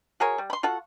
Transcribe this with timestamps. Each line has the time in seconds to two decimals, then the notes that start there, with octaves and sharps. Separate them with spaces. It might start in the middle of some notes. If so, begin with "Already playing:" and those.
0.20 F#4 G#4 A#4 C#5
0.38 G3
0.50 B5 C6
0.63 F4 F#4 A4 F#5